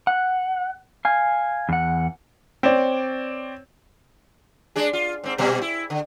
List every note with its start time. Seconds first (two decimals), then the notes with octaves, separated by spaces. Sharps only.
0.07 F#5
1.05 F5 G#5
1.69 E2 F#5
2.63 C4 C#5 D5
4.76 G#3 D4 G#4
4.93 F4
5.24 G#2 C4
5.38 A#2 G3
5.61 E4
5.90 D3